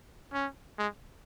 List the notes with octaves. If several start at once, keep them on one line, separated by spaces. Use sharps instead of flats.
C#4
G#3